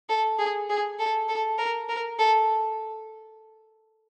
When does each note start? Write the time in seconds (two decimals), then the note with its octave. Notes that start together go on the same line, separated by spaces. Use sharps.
0.09 A4
0.39 G#4
0.69 G#4
0.99 A4
1.28 A4
1.58 A#4
1.89 A#4
2.19 A4